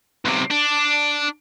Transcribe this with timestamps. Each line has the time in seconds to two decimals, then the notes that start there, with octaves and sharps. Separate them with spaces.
0.25 B1 C3
0.50 D4